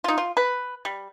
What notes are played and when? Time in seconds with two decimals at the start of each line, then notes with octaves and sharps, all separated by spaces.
0.04 D#4 F4
0.18 F4
0.37 B4
0.85 G3